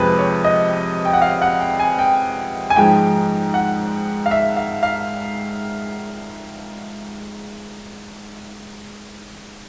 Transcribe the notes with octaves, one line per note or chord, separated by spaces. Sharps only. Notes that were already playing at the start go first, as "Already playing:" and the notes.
Already playing: F2 C3 F3 G#3 B4
C#5
D#5
G5
F#5
F5
F#5
G5
G#5
G5
G#5
G#2 F3 G#3 G5
F#5
F5
E5
F5
F5